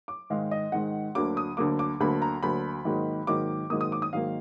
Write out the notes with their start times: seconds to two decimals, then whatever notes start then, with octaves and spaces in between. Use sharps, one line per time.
0.08 D6
0.30 G#2 D#3 G#3 F5
0.51 D#5
0.72 G#2 D#3 G#3 F#5
1.15 D2 D3 F#3 A#3 D6
1.37 D#6
1.57 D2 D3 F#3 A#3 D6
1.79 D6
2.00 D2 D3 F#3 A#3 B5
2.22 A#5
2.43 D2 D3 F#3 A#3 B5
2.85 G#2 D#3 F#3 A#3
3.27 G#2 D#3 F#3 A#3 D6
3.70 G#2 D#3 F#3 A#3 D#6
3.81 D#6
3.92 D6
4.02 D#6
4.13 G#2 D#3 F#3 A#3 F5